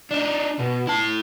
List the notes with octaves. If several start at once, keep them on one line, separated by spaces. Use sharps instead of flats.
D4 D#4
B2
E4 A5